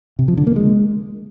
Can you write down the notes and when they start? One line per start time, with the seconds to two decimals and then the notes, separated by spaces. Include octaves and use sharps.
0.19 C3
0.28 F3
0.37 D3
0.47 A#3
0.56 G#3